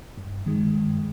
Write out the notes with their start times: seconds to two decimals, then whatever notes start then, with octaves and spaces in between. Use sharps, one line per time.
0.17 G2
0.46 D#3 G#3
0.75 G2